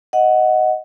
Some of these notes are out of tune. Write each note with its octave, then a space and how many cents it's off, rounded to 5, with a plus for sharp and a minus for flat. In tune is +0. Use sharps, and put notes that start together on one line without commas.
D#5 +5 F#5 +0